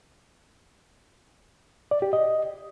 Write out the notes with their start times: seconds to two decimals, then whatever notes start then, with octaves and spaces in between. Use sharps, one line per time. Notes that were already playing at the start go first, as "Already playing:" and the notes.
1.91 D5
2.02 G4
2.13 D#5